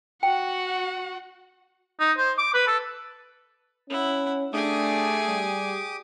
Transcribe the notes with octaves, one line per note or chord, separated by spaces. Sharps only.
F#4 F#5 G5
D#4
C5
D6
B4
A4
C#4 E4 F#5
A3 D4 G4 G#4 G#5 D6 D#6
G3